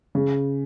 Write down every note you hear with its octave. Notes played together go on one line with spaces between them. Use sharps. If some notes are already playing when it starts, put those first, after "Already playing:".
C#3